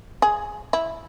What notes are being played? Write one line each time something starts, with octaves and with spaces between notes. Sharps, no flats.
G#4
E4